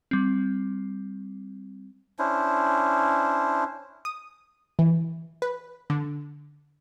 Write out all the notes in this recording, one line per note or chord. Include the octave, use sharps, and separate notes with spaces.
G3 C4
C#4 D4 E4 C5
D#6
E3
B4
D3